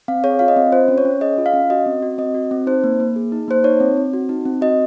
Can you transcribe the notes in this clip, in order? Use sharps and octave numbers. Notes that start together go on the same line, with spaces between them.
C4 F5
G#4 C#5
F4 F5
D#5
C4
F4 C5
C#4
C#5
C#4
G#4 D#5
F4
F5
C#4
F#4 D#5
C4
F#4
C4 D#5
F#4
C4
D#4 C5
A#3
A#3
G#4
D#4
A#3 C5
D#4 C#5
C4
C4
F#4
D#4
C4
F#4 D#5